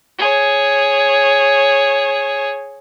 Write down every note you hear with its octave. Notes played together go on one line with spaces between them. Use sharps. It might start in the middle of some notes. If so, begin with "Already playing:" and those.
G#4 C#5